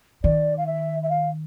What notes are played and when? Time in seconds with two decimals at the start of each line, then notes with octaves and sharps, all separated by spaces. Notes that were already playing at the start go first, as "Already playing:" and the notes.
0.24 D#3 D5
0.57 F5
0.66 E5
1.03 E5
1.09 F5